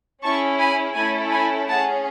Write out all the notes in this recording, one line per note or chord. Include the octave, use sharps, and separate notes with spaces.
C#4 E4 G#4 A5 C#6
G#5 B5
A3 C#4 E4 A4 G#5 B5
G#5 B5
C#4 G#4 F#5 A5